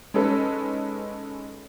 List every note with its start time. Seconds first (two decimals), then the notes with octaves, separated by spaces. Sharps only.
0.14 G#3 C#4 D#4 A4 B4